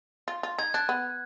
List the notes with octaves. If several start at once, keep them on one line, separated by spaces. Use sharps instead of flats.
F4
F4
D#4 G#6
D4 F#6
B3